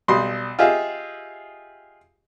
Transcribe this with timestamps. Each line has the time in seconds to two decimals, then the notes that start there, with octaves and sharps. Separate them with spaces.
0.08 B1 G3 B5 C6 D#6
0.59 F4 G4 G#4 D#5 E5